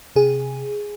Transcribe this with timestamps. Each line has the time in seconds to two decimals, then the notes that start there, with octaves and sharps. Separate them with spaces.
0.16 C3 G#4